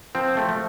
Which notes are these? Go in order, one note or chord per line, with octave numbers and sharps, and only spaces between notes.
F3 C4
A3
F3